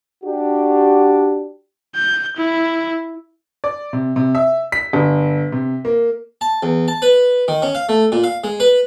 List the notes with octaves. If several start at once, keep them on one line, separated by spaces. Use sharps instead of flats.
D4 F#4 G4
G6
E4
D5
C3
C3
E5
B6
G1
C3
A#3
A5
E2
A5
B4
D#3
C#4
F5
A3
A#2
F5
G#3
B4